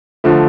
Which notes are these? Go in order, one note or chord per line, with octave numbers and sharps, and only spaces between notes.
D3 F3 A3